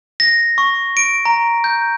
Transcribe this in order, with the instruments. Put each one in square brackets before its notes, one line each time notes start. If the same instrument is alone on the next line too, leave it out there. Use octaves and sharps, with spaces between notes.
[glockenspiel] A#6
C#6
D7
A#5
G6